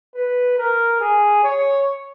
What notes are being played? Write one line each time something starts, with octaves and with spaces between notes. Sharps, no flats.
B4
A#4
G#4
C#5